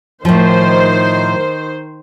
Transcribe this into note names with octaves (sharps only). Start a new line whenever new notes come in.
A2 D#3 F3 C5